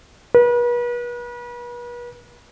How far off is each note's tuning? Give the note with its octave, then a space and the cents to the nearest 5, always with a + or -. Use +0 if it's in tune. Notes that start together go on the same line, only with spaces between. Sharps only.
B4 -40